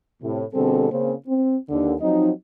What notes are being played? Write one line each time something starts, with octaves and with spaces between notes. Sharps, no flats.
A2 C3
B2 D3 G3 C4 G#4 A4
C#3 A#3 C4
C4
D#2 D3
F3 F#3 C4 D#4